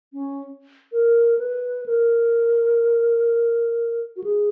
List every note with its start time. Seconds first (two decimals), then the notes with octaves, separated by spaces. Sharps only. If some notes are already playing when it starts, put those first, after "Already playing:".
0.13 C#4
0.92 A#4
1.39 B4
1.86 A#4
4.16 F#4
4.24 G#4